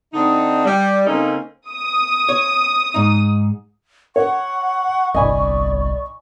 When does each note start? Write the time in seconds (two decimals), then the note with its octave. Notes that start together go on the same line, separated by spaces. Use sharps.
0.14 D3 C4 D4 D#4
0.64 G3
1.07 C#3 A#3 C4 C#4 D#4 A4
1.68 D#6
2.29 C#5
2.94 G#2 D#4
4.16 C#5 F#5 C#6
5.15 G1 C2 D5 D#5 G#5 B5